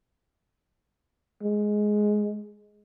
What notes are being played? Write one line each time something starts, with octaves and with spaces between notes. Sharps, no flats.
G#3